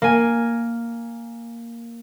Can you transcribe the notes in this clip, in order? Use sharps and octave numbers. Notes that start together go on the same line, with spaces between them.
A#3 G#5